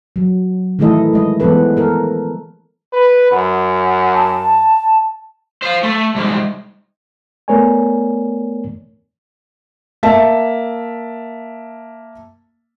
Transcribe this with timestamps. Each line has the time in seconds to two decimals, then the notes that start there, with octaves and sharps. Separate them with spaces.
0.16 F#3
0.79 D#3 E3 A3 E4 A4 D#5
1.14 G#3 D#5
1.40 E3 F3 G#3 B3 A4 B4
1.77 A4 A#4
2.93 B4
3.31 F#2 F#5
4.14 A5
5.63 C5 F5
5.83 A3
6.15 C2 G#2
7.48 A3 B3 A#4 C#5 D5 G#5
10.03 A#3 E5 A5